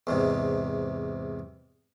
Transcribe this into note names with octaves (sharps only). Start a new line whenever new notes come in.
E2 G#2 C3